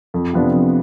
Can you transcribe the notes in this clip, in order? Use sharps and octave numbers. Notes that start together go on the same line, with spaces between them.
F2
C3 F3 B3 D4
F2